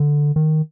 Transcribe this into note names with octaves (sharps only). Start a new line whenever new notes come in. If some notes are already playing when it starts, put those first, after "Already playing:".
Already playing: D3
D#3